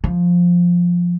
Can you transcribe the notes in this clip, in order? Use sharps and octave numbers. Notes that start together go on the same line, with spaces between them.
F3